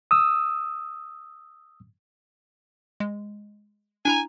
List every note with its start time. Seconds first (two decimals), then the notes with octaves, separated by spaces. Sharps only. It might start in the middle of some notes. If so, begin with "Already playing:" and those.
0.11 D#6 E6
3.00 G#3
4.05 D4 E4 G#5 A#5